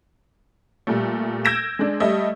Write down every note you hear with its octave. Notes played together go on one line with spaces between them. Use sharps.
A#2 G3 A3
E6 G6 G#6 A#6 D7 E7
G#3 D4
G3 A3 D#5 E5